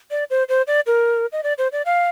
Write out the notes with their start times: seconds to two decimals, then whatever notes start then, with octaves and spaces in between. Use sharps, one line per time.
0.11 D5
0.30 C5
0.49 C5
0.67 D5
0.87 A#4
1.32 D#5
1.43 D5
1.58 C5
1.72 D5
1.86 F5